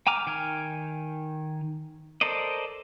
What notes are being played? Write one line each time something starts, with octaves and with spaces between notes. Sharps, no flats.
G5 G#5 A#5 D6 F6
D#3 G5 G#5 F6
A4 A#4 C5 D5 D#5